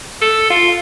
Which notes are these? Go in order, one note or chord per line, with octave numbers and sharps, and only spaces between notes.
A4
F4